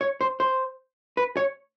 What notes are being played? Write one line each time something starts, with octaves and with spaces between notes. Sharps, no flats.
C#5
C5
C5
B4
C#5